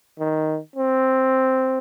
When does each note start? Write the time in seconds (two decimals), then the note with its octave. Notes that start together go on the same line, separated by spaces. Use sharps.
0.20 D#3
0.76 C4